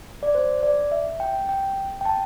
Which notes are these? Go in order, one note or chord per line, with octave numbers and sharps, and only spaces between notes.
D5
C5
D5
E5
G5
G5
G5
A5